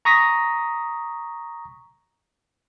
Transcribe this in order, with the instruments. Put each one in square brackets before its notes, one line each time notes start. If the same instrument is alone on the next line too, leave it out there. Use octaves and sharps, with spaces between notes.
[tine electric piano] A#5 C#6 D#6 A#6 B6